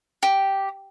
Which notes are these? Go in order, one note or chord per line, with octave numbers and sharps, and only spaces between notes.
G4